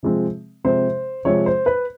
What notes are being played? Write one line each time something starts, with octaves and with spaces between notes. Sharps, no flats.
C3 F3 G#3 C4
C3 F3 G#3 C4 C5
C3 F3 G#3 C4 C#5
C5
B4